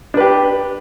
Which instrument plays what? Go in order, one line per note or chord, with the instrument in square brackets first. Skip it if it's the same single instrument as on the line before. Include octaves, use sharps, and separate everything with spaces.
[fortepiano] D4
B4
G4